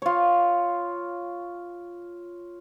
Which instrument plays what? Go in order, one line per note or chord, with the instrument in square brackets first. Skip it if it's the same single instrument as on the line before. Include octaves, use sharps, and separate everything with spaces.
[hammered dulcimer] F4 C#5